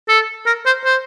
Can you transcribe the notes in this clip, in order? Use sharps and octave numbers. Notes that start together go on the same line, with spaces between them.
A4
A#4
C5
C5